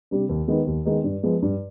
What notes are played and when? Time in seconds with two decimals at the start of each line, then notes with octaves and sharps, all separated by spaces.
0.11 C3 G3 D4
0.29 D#2
0.48 D#3 G#3 B3 D#4
0.67 D#2
0.85 D#3 G#3 B3 D#4
1.04 G2
1.23 F3 G#3 B3
1.42 G2